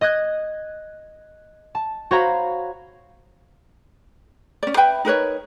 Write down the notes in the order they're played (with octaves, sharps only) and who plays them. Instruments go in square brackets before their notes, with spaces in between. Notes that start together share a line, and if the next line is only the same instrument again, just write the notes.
[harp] D#5 D#6 F#6 G#6
A5
F#4 C5 C#5 F5 A#5 B5
[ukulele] C#4 D5
B4 E5 G5 B5
D#4 A#4 B4 C#5